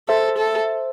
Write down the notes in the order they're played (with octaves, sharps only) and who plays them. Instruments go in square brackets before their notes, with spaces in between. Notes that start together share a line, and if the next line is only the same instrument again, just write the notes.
[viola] A4 [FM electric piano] C5 E5
[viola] A4